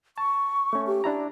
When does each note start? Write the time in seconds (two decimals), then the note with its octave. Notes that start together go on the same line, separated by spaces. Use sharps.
0.18 A5 C#6
0.73 A3 C#4
0.87 G4
1.04 D4 E4 A#5